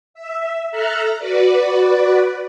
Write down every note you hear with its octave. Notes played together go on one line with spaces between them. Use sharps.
E5
A4 E5 A#5 F6 F#6
F#4 B4 D5